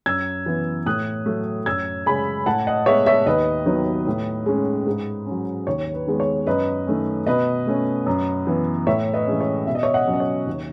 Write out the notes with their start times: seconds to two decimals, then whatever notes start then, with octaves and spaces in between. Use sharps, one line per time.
0.06 F#2 E6 G#6
0.46 E3 B3
0.86 A2 D#6 F#6
1.26 F#3 A3
1.66 F#2 E6 G#6
2.06 C#3 G#3 C#4 G#5 B5
2.46 A2 F#5 A5
2.67 D#5 F#5
2.86 G#3 B3 C#5 E5
3.06 C#5 E5
3.26 D#2 B4 D#5
3.66 D#3 F#3 B3
4.07 A2
4.46 G#3 C#4
4.87 G#2
5.26 F#3 C#4
5.67 D#2 C#5
5.94 B4
6.07 D#3 G#3 B3
6.20 C#5
6.47 F#2 B4 D#5
6.87 D#3 A3 C#4
7.26 B2 B4 D#5
7.67 A3 C#4
8.06 F#2
8.47 E3 B3
8.87 A2 C#5 E5
9.13 B4 D#5
9.27 E3 G#3 C#4
9.41 C#5
9.67 B2 E5
9.75 D#5
9.83 C#5 E5
9.94 D#5 F#5
10.07 F#3 C#4
10.13 D#5
10.20 C#5
10.46 D#2